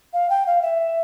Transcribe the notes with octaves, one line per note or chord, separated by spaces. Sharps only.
F5
G5
F5
E5